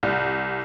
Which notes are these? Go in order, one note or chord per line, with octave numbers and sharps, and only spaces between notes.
C2